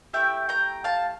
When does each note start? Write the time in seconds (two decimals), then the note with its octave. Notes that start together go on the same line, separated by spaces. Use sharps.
0.13 A3 E4 G4 E5 G5
0.49 G5 A#5
0.84 F5 A5